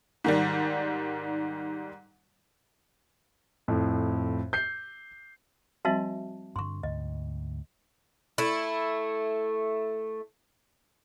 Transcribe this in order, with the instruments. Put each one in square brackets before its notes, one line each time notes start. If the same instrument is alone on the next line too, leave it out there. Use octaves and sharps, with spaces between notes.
[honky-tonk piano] G#2 D#3 G3
[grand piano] F2 A2
G6 C7
[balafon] F3 G3 C4 [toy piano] F#4 E5 A5
[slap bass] G2 D3 [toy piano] C6 C#6
[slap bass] D2 G#2 [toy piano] D#5
[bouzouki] A3 E4